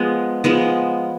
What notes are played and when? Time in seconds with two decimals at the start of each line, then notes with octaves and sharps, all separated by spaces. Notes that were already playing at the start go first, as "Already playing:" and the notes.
Already playing: F3 G#3 B3
0.44 F3 G#3 B3